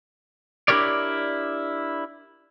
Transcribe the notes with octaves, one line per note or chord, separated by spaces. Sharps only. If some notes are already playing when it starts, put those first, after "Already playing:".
D4 E4 G4 A#4 C#5 D5